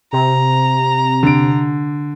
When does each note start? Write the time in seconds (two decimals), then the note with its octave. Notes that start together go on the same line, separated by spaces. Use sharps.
0.13 C3 A#5
1.23 D3 D7